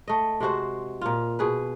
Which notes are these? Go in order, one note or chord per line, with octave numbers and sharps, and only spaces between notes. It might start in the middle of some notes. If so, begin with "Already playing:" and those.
A3 D#5
C3 G#3 F#4 C5
A#2 F4
B2 G#4 B4